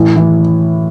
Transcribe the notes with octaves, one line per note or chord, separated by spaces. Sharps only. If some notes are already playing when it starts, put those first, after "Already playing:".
Already playing: A2 E3
E3